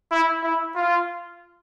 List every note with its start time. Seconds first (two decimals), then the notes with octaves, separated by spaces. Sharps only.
0.11 E4
0.43 E4
0.76 F4